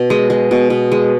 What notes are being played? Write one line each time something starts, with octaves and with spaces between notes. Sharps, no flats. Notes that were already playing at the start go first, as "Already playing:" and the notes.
Already playing: B2
G#3
G#3
B2
B2
G#3